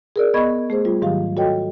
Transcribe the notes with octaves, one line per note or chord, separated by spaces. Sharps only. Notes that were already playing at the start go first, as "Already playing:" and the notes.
G#4 A#4 D5
B3 D#5 B5 C#6 G#6
A3 G#4 C5
G3 F4
G#2 D#3 F#3 G4 F5
F#4 A4 C#5 D#5 G5